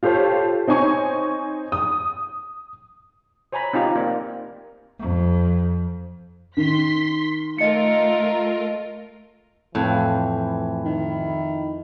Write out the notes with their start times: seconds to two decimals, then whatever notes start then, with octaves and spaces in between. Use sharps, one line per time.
0.03 F4 G4 A4 C5 C#5
0.67 C4 D#4 C#5 G#5 C#6
1.72 D#6
3.52 C5 C#5 G#5 A#5 B5
3.73 C4 D#4 F4 G4 A#5
3.96 A#3 C4 D5
5.00 F2
6.57 D#3 C6 B6
7.58 A3 F4 A#4 D#5 C#7
9.75 F2 A2 E3
10.85 D#3 E4